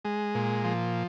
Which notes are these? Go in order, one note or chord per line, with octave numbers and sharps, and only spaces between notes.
G#3
A#2
F3